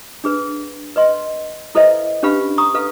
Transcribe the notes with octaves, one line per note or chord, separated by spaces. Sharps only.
D4 G#4 B4
B4 D#5 C6
E4 A4 B4 C5 D#5 E5
C#4 D4 G4 B4 F5 B5
A#5 C#6 D#6
A4 B4 F5